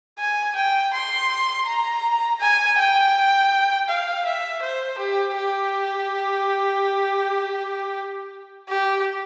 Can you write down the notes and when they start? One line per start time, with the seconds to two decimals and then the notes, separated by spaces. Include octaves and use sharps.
0.19 G#5
0.55 G5
0.93 C6
1.67 A#5
2.40 G#5
2.78 G5
3.88 F5
4.25 E5
4.62 C5
4.98 G4
5.36 G4
8.68 G4